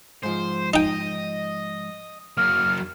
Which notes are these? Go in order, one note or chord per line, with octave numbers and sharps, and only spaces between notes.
G#2 F3 C5
D#4 D#5 G5
F#3 A#3 F6